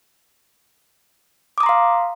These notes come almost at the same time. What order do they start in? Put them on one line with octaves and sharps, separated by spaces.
D6 D#6 A#5 C6 F5